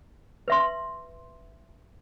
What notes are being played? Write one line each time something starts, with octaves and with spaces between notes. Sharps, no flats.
B4 E5 C6